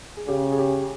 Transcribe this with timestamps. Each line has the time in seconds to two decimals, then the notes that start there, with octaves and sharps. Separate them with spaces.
0.17 G#4
0.28 C#3 G4
0.52 G#4
0.58 G4